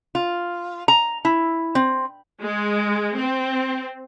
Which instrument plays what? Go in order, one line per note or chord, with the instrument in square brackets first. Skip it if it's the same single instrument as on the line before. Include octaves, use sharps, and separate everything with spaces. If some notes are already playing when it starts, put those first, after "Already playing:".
[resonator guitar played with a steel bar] F4
A#5
E4
C4
[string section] G#3
C4